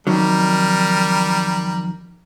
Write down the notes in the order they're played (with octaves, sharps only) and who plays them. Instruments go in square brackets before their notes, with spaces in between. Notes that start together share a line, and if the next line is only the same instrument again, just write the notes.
[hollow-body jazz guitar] F2 D#3 F#3 [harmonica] G3 A#4